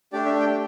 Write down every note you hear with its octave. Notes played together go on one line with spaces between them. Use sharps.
A3 D4 G4 D5
E5
G5